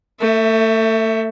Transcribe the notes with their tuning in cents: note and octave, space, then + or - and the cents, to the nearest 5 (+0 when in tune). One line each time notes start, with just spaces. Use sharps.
A3 +30 E5 +0